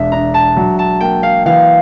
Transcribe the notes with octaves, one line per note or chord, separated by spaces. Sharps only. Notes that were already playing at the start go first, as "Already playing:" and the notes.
Already playing: E1 D4 E5
D4 A#5
A5
F#3
A5
A#3 G5
F5
E3 F5